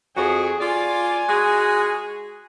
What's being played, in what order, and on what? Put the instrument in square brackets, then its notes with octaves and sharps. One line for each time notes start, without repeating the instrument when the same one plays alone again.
[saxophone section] F2 F#4 [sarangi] G#4
[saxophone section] F4 D5 [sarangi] G#5
[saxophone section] G#3 F#4 G#4